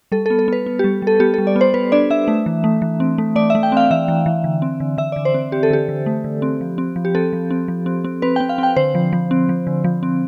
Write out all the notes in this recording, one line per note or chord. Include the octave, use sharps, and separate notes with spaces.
G3 A4
A4
B3
A4
B3 B4
B3
G4
G3
G3 A4
B3 G4
A4
G3
D5
B3
C5
B3 B4
D4 D5
D4 E5
A3
E3
A3
E3
C4
A3
A3 D5
E5
A3
G5
C4 F5
E3 E5
E3
E3
D3
C4
D3
D3 E5
D3 D5
C5
C4
C4 G4
A4
D3 G4
D3
A3
D3
C4
F3
C4
F3
G4
C4 A4
F3
C4
F3
C4
C4
C4 B4
C4 G5
F5
C4 G5
D3 C5
F3
F3
C4
F3
D3
F3
C4